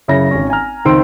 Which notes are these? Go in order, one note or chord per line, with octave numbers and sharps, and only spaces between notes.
F#2 C#3 E4 C#5 A#6
G#1 C#4
G#5 A#5 F6
C#2 D#3 C4 C6 E6 D7